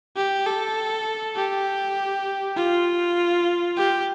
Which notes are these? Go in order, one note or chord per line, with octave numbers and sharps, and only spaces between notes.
G4
A4
G4
F4
G4